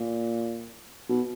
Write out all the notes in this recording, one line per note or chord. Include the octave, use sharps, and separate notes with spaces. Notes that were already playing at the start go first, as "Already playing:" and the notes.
Already playing: A#2
B2